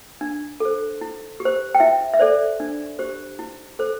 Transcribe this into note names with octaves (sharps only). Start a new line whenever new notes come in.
D4
A4 C5
E4
G4
C5
G5
E4 E5
E5
A4 C5 D5
D4
G4 C5
E4
A4 C5